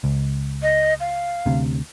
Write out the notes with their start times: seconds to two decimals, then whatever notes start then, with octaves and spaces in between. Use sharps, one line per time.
0.04 C#2
0.62 D#5
1.00 F5
1.46 D2 C3